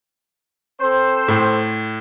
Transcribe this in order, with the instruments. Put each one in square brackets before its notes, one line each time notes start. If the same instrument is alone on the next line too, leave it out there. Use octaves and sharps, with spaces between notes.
[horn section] C4 A4 C5
[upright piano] A2